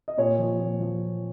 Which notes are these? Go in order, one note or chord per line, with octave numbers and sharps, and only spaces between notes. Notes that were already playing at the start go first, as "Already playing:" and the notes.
D#5
A#2 C#5
F3
A#2
F3